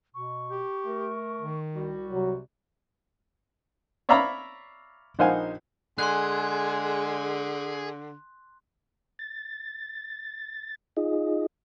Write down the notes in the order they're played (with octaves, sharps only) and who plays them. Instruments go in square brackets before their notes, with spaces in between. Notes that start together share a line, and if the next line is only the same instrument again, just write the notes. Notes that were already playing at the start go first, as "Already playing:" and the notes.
[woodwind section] B2 [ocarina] C#6
[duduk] G4
[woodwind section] A3 A#4
[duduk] D#3
[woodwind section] C2 G3 F#4
[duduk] C3 [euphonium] F#3
[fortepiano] C#5 D5 E5 F5 A#5 B5
A#1 D#4 C5 F5 F#5 G#5
[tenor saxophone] D3 [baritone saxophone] G#3 [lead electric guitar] G#4 [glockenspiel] C6 F#6
[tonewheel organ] A6
D#4 F4 G#4 D#5